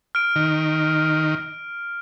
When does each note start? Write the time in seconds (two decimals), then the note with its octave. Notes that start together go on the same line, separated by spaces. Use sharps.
0.15 F6 D7
0.36 D#3